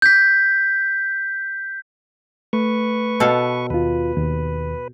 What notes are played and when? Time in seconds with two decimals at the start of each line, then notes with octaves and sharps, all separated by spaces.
0.02 G6 B6
2.53 A3 B4 C#6
3.20 B2 A4 F5
3.70 D#2 F4 B4
4.17 D#2